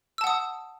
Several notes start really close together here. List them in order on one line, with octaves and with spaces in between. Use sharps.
E6 A5 F#5 D#6